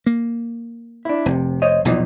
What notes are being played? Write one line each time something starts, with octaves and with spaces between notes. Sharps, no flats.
A#3
D4 E4
F1 C3
C5 C#5 D#5
B1 E2 A#2 E3 F3 D#4